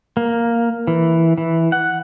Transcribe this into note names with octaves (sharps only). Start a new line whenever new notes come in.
A#3
E3
E3
F#5